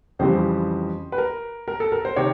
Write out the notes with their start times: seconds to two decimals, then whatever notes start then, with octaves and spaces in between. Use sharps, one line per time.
0.19 F2 C#3 E3 G3 C4 C5
1.12 B4
1.18 A#4
1.68 A#4
1.80 A4
1.92 A#4
2.05 C5
2.16 C3 D#3 C#5